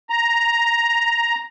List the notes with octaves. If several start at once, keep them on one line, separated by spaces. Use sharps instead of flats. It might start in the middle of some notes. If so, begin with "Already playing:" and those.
A#5